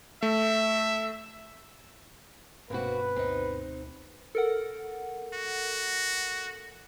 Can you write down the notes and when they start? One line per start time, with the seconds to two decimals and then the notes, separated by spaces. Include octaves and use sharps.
0.22 A3 E5
2.70 F1 G2 B2 A#3 C4 F#4 B4
3.16 D2 C4 D#4
4.35 A4 A#4 F#5
5.34 F#4